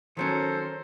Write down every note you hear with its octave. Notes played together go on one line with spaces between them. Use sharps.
D#3 F#3 C#4 A4 A#4 C5